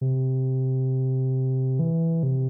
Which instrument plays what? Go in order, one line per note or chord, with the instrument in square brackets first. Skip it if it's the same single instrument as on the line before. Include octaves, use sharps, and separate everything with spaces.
[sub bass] C3
E3
C3